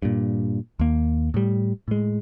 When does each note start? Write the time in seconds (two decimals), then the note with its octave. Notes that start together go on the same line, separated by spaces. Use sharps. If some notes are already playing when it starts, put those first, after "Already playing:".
0.02 G2 A#2
0.79 D#2 A#3
1.34 A2 G3
1.88 A2 G#3